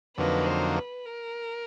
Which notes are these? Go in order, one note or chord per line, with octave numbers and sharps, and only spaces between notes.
F2 D3 F#3 A#3 D#4 B4
C5
B4
A#4